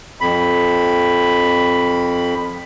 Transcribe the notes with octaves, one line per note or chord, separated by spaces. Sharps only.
F2 B5